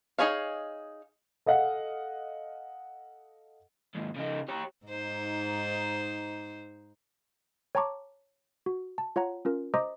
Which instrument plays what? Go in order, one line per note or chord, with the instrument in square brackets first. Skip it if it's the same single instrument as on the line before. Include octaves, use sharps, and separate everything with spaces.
[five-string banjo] D#4 E4 G#4 C#5 F5
[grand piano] A4 D#5 F5 F#5
[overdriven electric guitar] D#2 G#2
C#3 D#4
G4 C#5
[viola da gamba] G#2 D#4 C5
[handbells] C#5 G5 A5 A#5 C#6 D6
F#4
A5
F4 C#5 F#5 A#5
C#4 F4 A#4
C5 D#5 A#5 C6 D6 D#6